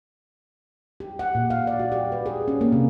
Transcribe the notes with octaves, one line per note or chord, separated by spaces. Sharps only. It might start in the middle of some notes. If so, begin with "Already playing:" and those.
G4
F#5
A#2
F5
D5
F#4
G4
B4
G#4
C#4
A#3
C3